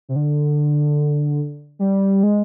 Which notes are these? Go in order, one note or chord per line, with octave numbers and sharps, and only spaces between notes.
C3
D3
G3
G#3